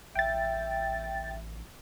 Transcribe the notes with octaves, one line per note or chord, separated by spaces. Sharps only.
A1 E5 G5 A6